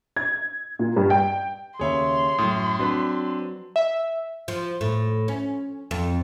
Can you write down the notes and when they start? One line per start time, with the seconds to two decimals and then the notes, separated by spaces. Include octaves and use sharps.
0.16 G#6
0.79 A#2
0.96 G2
1.10 G5
1.79 D#2 C#3 G#4 C#5 E5 C6
2.38 F#2 A2 D#6
2.79 F#3 C4 D4 B4
3.76 E5
4.48 F3
4.81 A2
5.28 C#4
5.91 F2